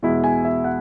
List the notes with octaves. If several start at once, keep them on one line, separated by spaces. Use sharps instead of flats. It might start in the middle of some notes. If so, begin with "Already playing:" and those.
E2 B2 G#3 E4
G#5
E5
F#5